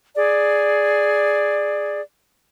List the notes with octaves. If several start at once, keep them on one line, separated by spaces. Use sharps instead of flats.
G#4 D5